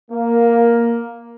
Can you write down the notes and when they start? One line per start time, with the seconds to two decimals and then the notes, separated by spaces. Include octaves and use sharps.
0.11 A#3